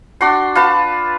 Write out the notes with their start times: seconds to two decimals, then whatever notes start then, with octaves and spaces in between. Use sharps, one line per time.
0.21 D4 F#4 C6
0.55 F4 B4 A5